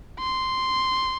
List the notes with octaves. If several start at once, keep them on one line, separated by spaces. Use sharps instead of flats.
C6